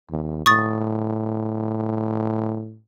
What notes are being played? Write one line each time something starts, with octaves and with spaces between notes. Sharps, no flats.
D#2
A2 C#6 D#6 A6